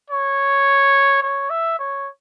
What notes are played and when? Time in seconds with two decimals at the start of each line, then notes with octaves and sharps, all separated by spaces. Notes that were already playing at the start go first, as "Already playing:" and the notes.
0.10 C#5
1.23 C#5
1.50 E5
1.79 C#5